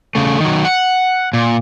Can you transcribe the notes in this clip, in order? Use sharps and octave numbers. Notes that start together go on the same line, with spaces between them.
C#3 A3
D#3 F#3
F#5
A#2